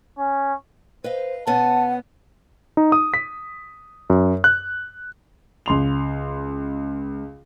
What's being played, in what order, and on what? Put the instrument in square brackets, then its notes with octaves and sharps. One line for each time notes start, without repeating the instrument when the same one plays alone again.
[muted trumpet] C#4
[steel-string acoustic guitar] B4 D#5 F5 [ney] C5
[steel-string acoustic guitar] B2 B3 C#4 [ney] F#5 [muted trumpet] A5
[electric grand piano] D#4
D#6
B6
F#2
F#6
[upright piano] C#2 C6 F7